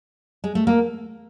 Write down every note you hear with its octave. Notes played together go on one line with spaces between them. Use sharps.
G#3
A3
A#3